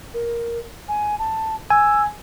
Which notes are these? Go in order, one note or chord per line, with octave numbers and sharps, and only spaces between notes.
A#4
G#5
A5
G#5 E6